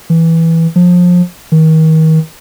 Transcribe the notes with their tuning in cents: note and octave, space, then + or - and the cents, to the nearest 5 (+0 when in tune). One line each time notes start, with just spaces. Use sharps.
E3 -5
F3 +25
D#3 +35